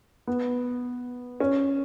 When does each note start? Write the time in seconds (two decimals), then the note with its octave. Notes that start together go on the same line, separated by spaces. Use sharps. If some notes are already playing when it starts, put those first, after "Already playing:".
0.27 B3
1.40 C#4